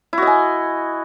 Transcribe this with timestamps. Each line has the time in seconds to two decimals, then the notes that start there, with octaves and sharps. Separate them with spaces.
0.13 E4
0.18 F#4
0.22 D#5
0.27 G#5